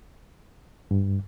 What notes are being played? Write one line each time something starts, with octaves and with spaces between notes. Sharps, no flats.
G2